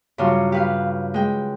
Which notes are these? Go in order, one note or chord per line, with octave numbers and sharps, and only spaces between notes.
G2 C#3 F#3 F4
G4 B4 F5
G#3 G5